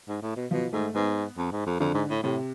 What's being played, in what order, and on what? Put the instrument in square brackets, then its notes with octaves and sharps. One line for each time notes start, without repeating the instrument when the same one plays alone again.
[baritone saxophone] G#2
A2
B2
[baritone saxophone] B2 [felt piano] F3
[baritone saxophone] G#2 [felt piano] A3
[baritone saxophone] G#2 [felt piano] B3
[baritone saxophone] F2
G#2
F2
[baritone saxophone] F2 [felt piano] D3
[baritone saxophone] G#2
A2
[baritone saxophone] A2 [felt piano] C3